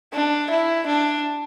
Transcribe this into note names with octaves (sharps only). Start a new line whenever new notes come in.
D4
E4
D4